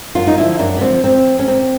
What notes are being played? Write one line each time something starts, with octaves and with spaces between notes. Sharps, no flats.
F#2 F4
D#4
D3 F3 E4
F#2 D4
B3
D3 F3 C4
A#2 C4
F3
C#4
A#2 C4